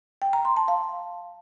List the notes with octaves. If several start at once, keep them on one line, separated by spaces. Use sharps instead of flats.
G5
A#5
C6
A5
F5